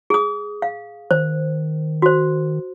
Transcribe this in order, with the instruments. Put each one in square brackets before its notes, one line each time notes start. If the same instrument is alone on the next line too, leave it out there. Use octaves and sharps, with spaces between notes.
[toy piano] G#4 D#6
F5
[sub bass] D#3 [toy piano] C5
[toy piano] F#4 C5